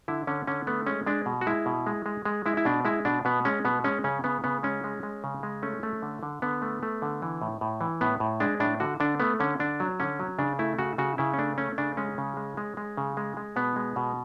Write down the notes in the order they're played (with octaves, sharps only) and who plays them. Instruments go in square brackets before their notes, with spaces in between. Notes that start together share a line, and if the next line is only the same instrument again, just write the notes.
[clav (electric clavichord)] D3 E4
D3 C#4
D3 C#4
A3 B3
G#3 C#4
G#3 D4
B2
F#4
G#3 E4
B2
G#3
G#3
G#3
G#3 E4
E4
B2 D4
G#3 E4
B2 D4
B2 B3
G#3 C#4
B2 B3
G#3 C#4
C#3 C#4
C#3 B3
C#3 B3
G#3 C#4
G#3
G#3
C#3
G#3
A3 C#4
A3
D3
D3
D3 B3
A3
A3
D3
E3
A2
A2
E3
A2 B3
A2
G#3 D4
A2 D4
D3 F#4
D3 D4
A3 B3
D3 C#4
D3 D4
F#3
D3 C#4
F#3
C#3 D4
A3 E4
C#3 F#4
C#3 F#4
C#3 E4
C#4
A3 D4
A3 C#4
C#3 D4
G#3 C#4
C#3
G#3
G#3
G#3
C#3
G#3
G#3
B2 B3
G#3
B2